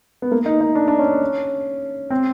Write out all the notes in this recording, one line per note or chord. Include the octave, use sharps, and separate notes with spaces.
B3
A#3
D#4
D#4
D4
D4
C#4
C4